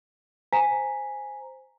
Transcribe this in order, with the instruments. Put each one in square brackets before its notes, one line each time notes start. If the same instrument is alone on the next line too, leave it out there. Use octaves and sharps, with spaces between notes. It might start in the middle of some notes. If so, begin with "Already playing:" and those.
[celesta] C5 G#5 A#5 B6